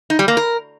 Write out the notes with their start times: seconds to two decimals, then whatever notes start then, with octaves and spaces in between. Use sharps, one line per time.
0.10 D#4
0.19 G3
0.28 A#3
0.37 A#4